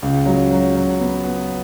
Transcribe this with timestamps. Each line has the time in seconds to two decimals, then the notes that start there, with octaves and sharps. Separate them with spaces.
0.02 C#2
0.26 F#3
0.51 F#3
0.75 F#3
1.00 B3
1.25 B3